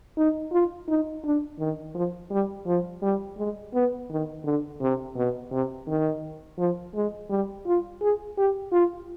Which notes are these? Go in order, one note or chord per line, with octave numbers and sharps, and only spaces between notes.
D#4
F4
D#4
D4
D#3
F3
G3
F3
G3
G#3
B3
D#3
D3
C3
B2
C3
D#3
F3
G#3
G3
F4
G#4
G4
F4